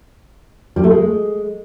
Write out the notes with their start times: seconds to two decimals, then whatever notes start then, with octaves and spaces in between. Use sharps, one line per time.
0.76 G3
0.84 A3
0.91 G#3